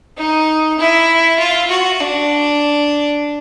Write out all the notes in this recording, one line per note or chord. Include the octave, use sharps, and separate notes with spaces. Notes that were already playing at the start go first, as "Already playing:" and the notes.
D#4
E4
F4
F#4
D4